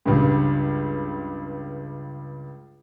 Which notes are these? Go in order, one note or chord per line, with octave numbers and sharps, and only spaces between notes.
C#2 G2